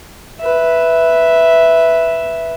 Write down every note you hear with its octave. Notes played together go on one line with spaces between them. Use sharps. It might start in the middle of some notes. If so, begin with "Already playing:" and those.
B4 E5